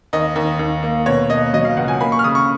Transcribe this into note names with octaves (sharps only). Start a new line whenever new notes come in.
D#2 D#5
D#2
D#2
A#3
B2 C#5
A#3 D#5
F#3 D#5
F5
C#2 F#5
G#5
A#3 B5
C#6
F6
C#3 D#6
C#6